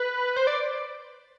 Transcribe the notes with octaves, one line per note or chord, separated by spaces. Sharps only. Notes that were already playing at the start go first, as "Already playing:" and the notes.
Already playing: B4
C5
D5